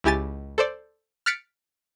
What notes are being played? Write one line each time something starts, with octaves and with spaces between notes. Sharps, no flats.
C#2 E4 G4 G#5 A6
A4 C5 D5
F6 F#6 A6 B6 C#7 D7